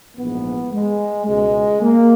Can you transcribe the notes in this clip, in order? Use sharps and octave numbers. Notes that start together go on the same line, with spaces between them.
A#1 G#2 E3 B3
G#3
C#2 B2 G#3
A#3